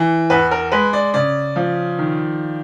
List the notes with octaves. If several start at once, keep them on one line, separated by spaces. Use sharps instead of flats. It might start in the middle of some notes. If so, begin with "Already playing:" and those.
Already playing: E3
E2 B4
A#4
G#3 B4
D5
C#3 D5
F3
D#3